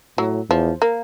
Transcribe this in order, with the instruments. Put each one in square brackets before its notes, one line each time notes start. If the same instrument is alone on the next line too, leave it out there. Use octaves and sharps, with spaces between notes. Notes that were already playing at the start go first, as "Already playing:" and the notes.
[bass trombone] A2 [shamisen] F#3
[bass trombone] E2 [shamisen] F3
[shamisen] A#3